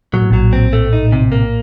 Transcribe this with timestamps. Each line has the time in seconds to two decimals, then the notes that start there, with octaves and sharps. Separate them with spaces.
0.13 A#2 F#3
0.22 A2
0.30 A#1 A#2 F#3
0.53 C4
0.73 A3
0.93 D#4
1.12 C3
1.32 A#3